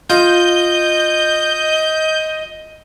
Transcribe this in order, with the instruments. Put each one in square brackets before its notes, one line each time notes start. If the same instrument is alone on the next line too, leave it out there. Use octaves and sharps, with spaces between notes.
[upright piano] F4 [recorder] D#5 [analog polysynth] G6